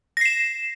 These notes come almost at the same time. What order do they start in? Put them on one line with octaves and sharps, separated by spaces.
A#6 C7 E7